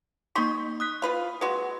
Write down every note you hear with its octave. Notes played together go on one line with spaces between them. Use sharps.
A#3 D#4 C6 C#6 B6
D#6 F#6 B6
F4 B4 F5
G#3 F#4 B4 C6